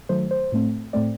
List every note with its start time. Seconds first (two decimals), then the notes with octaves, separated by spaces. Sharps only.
0.09 D#3 F#3 A3 C5
0.31 C5
0.52 A2 A3 C4
0.93 A2 A3 C4 D5